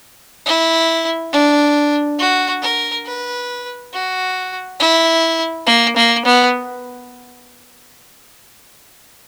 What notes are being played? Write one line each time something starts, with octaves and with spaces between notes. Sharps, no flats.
E4
D4
F#4
A#4
B4
F#4
E4
A#3
A#3
B3